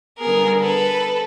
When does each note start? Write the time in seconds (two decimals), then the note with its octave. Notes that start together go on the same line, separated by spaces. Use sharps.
0.20 D3 G3 B3 G#4 A#4
0.61 A4 B4